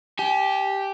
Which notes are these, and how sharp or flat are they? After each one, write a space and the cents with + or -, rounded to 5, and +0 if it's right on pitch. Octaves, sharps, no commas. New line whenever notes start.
G4 +0 G#5 +40